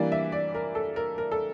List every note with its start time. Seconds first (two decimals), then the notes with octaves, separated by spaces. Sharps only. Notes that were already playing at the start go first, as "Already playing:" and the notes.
Already playing: E3 G3 A#3 D4 D5
0.12 E5
0.32 D5
0.55 A#4
0.75 A4
0.96 A#4
1.18 A#4
1.32 A4